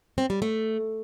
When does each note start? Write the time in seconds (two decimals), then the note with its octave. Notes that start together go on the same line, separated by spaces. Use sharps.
0.18 C4
0.30 G3
0.42 A3